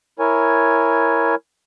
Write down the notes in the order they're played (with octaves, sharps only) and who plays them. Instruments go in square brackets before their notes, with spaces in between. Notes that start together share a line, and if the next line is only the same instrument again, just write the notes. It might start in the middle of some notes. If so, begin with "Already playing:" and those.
[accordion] E4 A#4 C#5 G#5